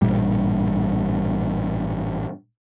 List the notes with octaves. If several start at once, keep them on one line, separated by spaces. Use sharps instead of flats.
A1 G2 A#2 G3